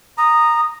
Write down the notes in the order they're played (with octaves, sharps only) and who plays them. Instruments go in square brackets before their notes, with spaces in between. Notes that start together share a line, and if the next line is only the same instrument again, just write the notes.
[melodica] A#5 [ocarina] D#6